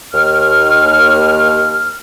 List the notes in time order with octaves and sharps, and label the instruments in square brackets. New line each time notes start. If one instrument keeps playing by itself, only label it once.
[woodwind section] D#2 F6